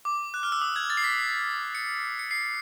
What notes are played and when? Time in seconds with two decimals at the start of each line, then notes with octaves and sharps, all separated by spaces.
0.05 D6
0.34 F#6
0.43 F6
0.52 E6
0.62 D#6
0.76 G#6
0.90 A6
0.97 C7
1.04 B6
1.75 C#7
2.19 C#7
2.31 C7